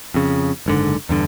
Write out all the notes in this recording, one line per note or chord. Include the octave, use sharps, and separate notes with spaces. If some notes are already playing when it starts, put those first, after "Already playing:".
F2 C#3
F#1 G#2 D3
E2 G2 D3